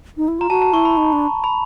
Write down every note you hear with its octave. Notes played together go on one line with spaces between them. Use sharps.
D#4
E4
F4 A#5
F#4 A5
A5
E4 C#6
B5
D#4
D4
B5